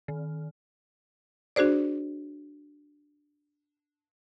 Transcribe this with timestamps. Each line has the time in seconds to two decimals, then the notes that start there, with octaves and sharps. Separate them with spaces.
0.08 D#3
1.56 D4 F#4 G#4 C5 D5